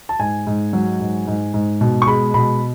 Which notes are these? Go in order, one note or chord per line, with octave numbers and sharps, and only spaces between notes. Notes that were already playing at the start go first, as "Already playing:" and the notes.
A5
G#2 G#5
G#2
F#3
G#2
G#2
G#2
B2
C#6
G#3 B5
B2 B5